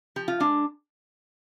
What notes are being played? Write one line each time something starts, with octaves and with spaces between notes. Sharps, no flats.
F3 G4
F4
G#3 D4